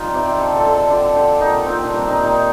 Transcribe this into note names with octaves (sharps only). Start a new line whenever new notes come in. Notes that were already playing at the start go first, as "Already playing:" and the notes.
Already playing: G3 C4 D#4 F4
C3 G4
D3 A4
A4
D3
A4
D3 G4
D3 G4
A#2 D#4
A#2 C4
D4
G3 C4
D#4
A#2
D#4